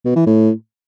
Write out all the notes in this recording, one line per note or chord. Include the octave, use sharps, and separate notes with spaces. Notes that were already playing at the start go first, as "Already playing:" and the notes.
B2
E3
A2